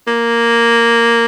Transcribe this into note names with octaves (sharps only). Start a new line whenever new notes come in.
A#3